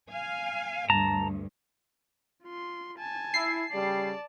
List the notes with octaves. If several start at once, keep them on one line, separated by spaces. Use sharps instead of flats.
F5 G#5
D2 G2 A5 A#5
F4 C6
G#5 A5
E4 C7
C#3 G3 D5 A5